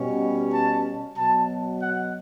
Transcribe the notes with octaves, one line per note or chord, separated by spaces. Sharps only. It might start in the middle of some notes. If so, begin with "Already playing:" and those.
Already playing: B2 G3 C#4
A5
B2 F#3 B3 A5
F#5